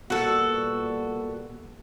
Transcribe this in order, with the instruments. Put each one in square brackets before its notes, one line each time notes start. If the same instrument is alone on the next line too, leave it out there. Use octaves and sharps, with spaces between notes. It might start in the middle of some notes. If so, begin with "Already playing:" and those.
[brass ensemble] A#2 G3 B3 [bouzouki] F#4 A4